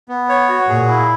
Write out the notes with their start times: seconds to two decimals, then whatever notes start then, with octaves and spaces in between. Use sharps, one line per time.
0.08 B3
0.29 C#5
0.49 F#4
0.69 A#2 G#4
0.88 E4